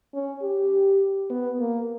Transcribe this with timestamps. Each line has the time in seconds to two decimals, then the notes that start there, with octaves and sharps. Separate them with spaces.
0.14 C#4
0.42 G4
1.30 B3
1.60 A#3